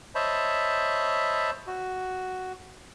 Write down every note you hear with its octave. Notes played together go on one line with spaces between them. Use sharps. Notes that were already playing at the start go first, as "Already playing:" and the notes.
C5 C#5 D#5 E5 A5 B5
F#4